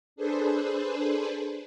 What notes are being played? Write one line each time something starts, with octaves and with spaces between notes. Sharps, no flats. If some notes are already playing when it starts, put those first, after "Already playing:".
D4 G#4 A4 B4 C5